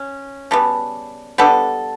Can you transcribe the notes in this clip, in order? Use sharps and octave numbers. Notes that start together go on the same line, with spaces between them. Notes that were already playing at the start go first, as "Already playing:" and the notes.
Already playing: C#4
C#3 G3 B3 A5
G3 B3 D4 A4 F#5